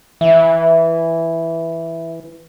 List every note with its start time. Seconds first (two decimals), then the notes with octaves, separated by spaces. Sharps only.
0.21 E3 E5